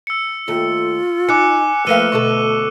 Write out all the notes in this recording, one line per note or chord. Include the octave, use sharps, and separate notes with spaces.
E6 C#7
D#2 A3 F4
D#4 G#5 D6 F#6 C#7
F3 A3 A#3 B4 F5 E6 D#7 G7
D2 B2 A4 C#6